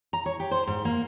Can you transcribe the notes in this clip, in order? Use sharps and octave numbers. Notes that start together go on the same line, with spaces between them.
A#5
C#5
G4
C5
G#2
A#3